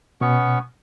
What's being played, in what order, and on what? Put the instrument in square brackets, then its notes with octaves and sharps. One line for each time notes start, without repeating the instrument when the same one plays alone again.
[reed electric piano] B2 [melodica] B3 C#4 C#6